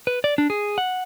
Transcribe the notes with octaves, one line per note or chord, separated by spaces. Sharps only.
B4
D5
D4
G#4
F#5